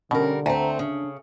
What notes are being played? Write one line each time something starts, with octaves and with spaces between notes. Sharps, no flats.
B2 D3 G3 C#4 A#4
D2 A3 C4 A#5
C#3 D4